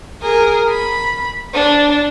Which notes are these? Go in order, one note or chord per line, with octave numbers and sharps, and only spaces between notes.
G#4 A#4
B5
D4